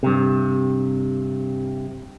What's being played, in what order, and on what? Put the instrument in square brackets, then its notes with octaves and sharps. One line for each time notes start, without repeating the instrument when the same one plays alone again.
[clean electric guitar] G2 C3